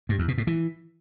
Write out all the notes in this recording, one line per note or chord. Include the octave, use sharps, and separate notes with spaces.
G2
E2
B2
A2
E3